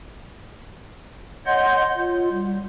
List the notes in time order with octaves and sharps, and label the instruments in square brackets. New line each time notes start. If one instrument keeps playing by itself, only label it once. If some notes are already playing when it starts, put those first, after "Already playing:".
[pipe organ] C#5 D#5 F#5 C6 G6
F4
G3